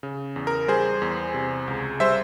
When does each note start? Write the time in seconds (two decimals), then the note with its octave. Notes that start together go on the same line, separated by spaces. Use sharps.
0.03 C#3
0.36 E2
0.47 A#4
0.68 G3 G#4 C5
1.02 E2
1.34 C3
1.68 C#2
2.00 G3 C5 E5